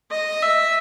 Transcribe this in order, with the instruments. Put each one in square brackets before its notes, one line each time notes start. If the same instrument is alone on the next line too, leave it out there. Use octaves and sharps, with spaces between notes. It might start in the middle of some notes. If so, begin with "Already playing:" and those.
[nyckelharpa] D#5
E5